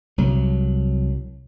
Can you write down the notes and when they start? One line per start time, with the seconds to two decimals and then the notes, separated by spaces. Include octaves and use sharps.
0.18 C2 F#3